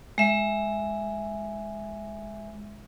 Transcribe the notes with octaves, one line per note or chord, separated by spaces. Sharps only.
G#3 E5